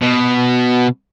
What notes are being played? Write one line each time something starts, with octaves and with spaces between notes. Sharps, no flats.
B2